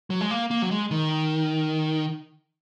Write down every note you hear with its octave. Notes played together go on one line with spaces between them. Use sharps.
F#3
G#3
A#3
A#3
F#3
G#3
D#3